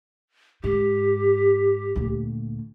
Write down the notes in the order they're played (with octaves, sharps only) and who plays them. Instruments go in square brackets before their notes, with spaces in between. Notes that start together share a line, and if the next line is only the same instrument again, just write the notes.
[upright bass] G#2 [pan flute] G4
[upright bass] D2 A#2